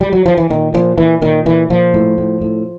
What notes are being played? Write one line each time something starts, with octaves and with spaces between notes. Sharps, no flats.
G3
F#3
F3
E3
A#2 D#3
A#2 F3
A#2 E3
A#2 D#3
A#2 E3
A#2 F3
A2
A2
A2